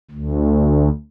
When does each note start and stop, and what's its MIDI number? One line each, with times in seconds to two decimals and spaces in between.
0.11 0.89 38